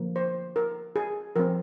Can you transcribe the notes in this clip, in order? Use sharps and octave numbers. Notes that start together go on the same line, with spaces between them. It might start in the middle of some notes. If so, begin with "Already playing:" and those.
Already playing: D3 F3 A#3
C5
A#4
G#4
F3 C4 A#4